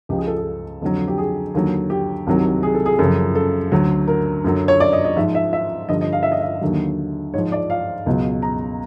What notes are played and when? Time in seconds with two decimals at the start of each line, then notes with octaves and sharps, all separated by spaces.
0.09 C#2 C#3 F3 G4
0.18 G#4
0.28 A4
0.37 G#4
0.82 F2 D3 F#3
1.08 G4
1.18 G#4
1.54 D#2 D3 F#3
1.90 G4
2.27 C2 C3 D#3 F#3
2.63 G#4
2.75 A4
2.86 G#4
2.99 F#2 C#3 F3 A4
3.35 A4
3.72 D2 D3 F#3
4.08 A#4
4.44 F#2 D3 F#3
4.68 C#5
4.80 D5
4.93 D#5
5.05 D#5
5.16 G#2 F3 E5
5.35 E5
5.53 E5
5.89 G2 D3 F3 D#5
6.01 D#5
6.13 F5
6.23 E5
6.32 D#5
6.41 E5
6.61 D#2 D3 F#3
7.34 G#2 F3 C#5
7.52 D5
7.70 F5
8.06 C#2 B2 F#3
8.42 A#5